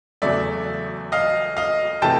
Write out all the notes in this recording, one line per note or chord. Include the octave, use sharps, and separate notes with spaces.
E2 C#3 F#3 A3 D5 E5
D#5 F5
D#5 F5
C3 E3 A3 G5 A5